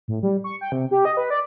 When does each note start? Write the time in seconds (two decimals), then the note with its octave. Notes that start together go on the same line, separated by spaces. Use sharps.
0.08 A2
0.23 G3
0.44 C#6
0.61 G5
0.72 C3
0.91 G4
1.05 D#5
1.17 B4
1.30 D5